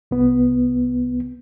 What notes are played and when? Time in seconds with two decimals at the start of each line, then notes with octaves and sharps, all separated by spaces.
0.11 C2 B3